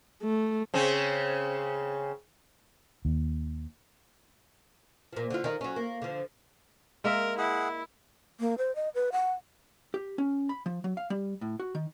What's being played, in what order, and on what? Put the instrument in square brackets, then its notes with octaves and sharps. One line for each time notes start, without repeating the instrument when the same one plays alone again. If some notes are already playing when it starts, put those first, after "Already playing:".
[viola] A3
[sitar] C#3 C4 C#4
[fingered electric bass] D#2
[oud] A#2 F3
D3 F4
D#3 D#4
F#3 C#4
A#3
D3 F3
[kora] G#3 A#3 E5 [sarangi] A#4
[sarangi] E4 [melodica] G#4 F#5
[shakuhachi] A#3
C5
D#5
B4
F#5
[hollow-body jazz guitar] G4
C#4
B5
F3
F#3
F5
G3
A2
F#4
D#3